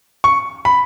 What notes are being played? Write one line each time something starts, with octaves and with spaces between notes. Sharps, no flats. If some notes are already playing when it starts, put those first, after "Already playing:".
C#6
B5